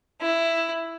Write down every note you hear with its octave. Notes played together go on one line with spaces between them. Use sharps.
E4